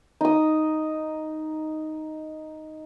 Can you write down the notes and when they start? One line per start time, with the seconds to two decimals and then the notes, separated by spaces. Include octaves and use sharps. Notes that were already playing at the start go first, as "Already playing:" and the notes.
0.21 D#4 D#6